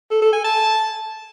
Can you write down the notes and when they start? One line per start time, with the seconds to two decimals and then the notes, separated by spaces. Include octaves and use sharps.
0.11 A4
0.22 A4
0.33 G#5
0.44 A5